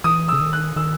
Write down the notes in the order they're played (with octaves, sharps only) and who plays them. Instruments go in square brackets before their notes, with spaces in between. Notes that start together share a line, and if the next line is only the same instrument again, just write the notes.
[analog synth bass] E3 [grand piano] D#6
[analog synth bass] C#3 [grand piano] E6
[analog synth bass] D#3
[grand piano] F#6
[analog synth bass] D#3 [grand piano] E6